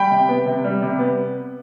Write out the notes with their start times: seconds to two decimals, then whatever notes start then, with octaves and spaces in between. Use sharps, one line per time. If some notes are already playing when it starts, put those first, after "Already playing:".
Already playing: G3 G5 B5
0.11 C3
0.29 B3
0.46 C3
0.64 G3
0.82 C3
0.99 B3